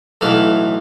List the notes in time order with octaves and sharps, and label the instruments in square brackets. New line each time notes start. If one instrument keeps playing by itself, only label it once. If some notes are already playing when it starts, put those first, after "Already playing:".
[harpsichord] B1 A2 E3 A4 F5